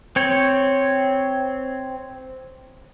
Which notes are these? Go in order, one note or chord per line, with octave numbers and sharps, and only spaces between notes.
C4 C#5